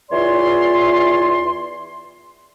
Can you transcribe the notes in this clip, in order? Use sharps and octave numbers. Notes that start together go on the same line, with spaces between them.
E2 E3 F4 C#5 D5 C6